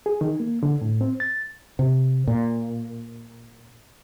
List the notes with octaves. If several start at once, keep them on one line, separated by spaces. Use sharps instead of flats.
G#4
D#3
A#3
D3
A2
C4
A6
C3
A#2